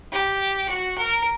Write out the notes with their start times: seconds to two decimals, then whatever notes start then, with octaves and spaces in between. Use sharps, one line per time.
0.12 G4
0.69 F#4
0.98 A#4